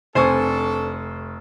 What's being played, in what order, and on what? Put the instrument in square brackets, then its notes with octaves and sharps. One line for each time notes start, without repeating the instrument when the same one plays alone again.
[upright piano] F1 C4 C#6 [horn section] D4 A4 [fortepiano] C5 G#5